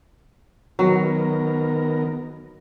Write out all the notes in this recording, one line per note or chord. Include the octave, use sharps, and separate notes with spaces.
D#3 F#3 B3 A#4